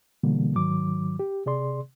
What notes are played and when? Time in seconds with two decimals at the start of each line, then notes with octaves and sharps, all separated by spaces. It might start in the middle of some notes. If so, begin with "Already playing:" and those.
0.23 B2 D3 E3 G3 A#3
0.55 G#2 D#3 F#3 D6
1.19 G4
1.46 C3 G#4 D5 C6